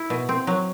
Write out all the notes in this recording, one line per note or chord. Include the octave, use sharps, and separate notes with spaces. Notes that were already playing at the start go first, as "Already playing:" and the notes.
Already playing: E4
B2
C4
F#3